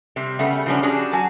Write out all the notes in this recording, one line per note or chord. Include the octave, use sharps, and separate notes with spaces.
C3 G3
C#3 G3 A3 B3
C#3 F3 G3 B3 C#4 D4
G3 C#4 D4 F#4 G#4
F#3 F#4 G#5 A5